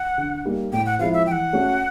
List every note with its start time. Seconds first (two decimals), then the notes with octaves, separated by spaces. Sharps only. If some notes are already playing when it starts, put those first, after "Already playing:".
Already playing: F#5
0.18 D3
0.45 G3 A#3 D#4
0.73 A2 G5
0.86 F#5
0.99 F3 G#3 C4 E4 F5
1.13 E5
1.26 E3 F#5 G5
1.53 A3 C#4 F#4